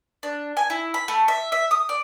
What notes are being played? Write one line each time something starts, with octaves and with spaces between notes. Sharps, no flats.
D4
G#5
E4
B5
A3
E5
E5
D#6
D5